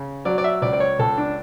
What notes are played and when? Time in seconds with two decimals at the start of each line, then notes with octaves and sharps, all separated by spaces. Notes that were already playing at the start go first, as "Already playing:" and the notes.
Already playing: C#3
0.25 F#3 D5
0.38 D5
0.44 E5
0.62 C#2 D5
0.73 D5
0.80 C#5
0.99 C#2 A4
1.18 D4